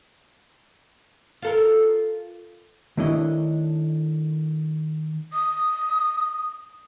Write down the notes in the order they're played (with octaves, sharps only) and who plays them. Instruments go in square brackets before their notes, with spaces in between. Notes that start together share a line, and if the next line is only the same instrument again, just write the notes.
[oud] F4 A4 A#4
[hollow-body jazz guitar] D#3 A3 D4 E4 C#5 D#5
[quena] D#6